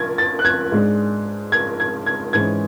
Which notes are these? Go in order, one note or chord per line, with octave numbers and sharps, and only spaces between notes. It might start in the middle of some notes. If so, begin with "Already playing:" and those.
Already playing: G#6 A6
A6
F#6
G#6
G#2 G#3 D4
G#6
G#6
G#6
G#2 E3 G#3 C#4 G#6